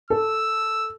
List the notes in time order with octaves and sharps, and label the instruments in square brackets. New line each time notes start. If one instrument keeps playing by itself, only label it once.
[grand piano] A4 [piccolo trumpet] E6